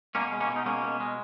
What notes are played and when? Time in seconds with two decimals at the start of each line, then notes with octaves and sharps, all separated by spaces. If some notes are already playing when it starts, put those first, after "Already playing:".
0.15 B2 A#3 C#4
0.32 G#3
0.40 A#3 C#4
0.49 B2
0.56 D#4
0.66 G#3 A#3 C#4
0.83 B2
1.00 G#3